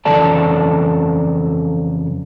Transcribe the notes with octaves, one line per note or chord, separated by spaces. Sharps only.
F2 C#3 E3 A4 D5 A5